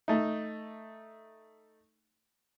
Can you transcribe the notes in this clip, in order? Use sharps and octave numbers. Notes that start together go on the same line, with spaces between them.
A3 D#4